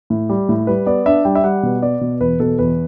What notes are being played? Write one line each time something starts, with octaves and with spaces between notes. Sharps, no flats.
A2
G3
A2
G3 B4
B3 D5
D4 E5
G3 G5
E5
G3 F#5
B2
B3 D5
B2
E2 B4
B2 A4
E2 B4